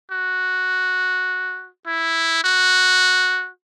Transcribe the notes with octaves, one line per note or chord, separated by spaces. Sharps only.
F#4
E4
F#4